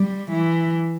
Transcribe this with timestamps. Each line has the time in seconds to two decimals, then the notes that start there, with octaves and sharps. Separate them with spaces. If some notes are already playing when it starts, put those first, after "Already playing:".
Already playing: G3
0.32 E3